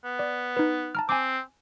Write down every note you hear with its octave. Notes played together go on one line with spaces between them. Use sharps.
B3
D5
D#4 B4
A5 A#5 F6
C4 G#5 D6